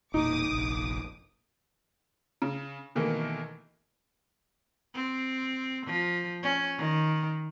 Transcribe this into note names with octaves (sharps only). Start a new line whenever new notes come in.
E1 A#2 D#4 D6 D#6
F1 A#1
C#3
B2 D#3 E3 A3 A#3
C4
F3
C#4
D#3